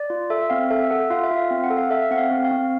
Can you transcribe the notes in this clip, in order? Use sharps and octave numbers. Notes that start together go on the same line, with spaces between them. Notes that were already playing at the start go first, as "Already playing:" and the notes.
Already playing: D5
F4
A4 E5
C4 F5
A4 E5
A4 F#5
F4 F5
E5
F4
F5
C4
F#5
A4
F5
A4 E5
C4 F#5
F5
C4
F5
C4